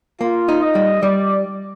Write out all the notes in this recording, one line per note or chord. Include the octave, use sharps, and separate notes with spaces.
A#3 F4
D#4
D#5
G3
G3 D5